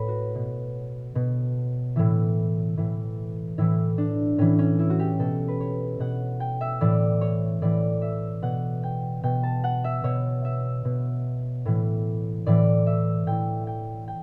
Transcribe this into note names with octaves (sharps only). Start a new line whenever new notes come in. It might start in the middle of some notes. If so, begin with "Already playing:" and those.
Already playing: A2 B4 C#5
F#4
B2
B2
A2 E3 E4
A2 E3
A2 E3 E4
D4
A2 E3 C#4
C#4
E4
F#4
G4
B2 A4
B4
C#5
B2 F#5
G5
E5
A2 E3 D5
C#5
A2 E3 D5
E5
B2 F#5
G5
B2 G5
A5
F#5
E5
B2 C#5
E5
B2
A2 E3
A2 E3 D5
E5
A2 E3 G5
G5
G5